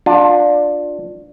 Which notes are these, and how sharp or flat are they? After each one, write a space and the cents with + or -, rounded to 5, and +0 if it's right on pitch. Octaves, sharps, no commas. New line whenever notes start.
D4 +5 F4 +25